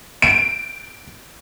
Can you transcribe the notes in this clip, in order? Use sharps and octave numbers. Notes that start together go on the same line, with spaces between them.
D7